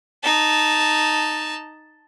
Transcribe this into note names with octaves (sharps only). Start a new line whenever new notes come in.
D#4 A5